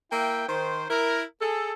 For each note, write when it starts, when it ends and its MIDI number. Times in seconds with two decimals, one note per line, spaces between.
0.12 0.44 58
0.12 0.44 64
0.12 0.44 76
0.12 0.44 79
0.49 0.86 51
0.49 0.86 72
0.90 1.23 64
0.90 1.23 70
1.41 1.72 68
1.41 1.72 69